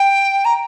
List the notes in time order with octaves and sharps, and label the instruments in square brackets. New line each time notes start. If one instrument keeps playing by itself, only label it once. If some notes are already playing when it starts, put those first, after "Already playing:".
Already playing: [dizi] G5
A#5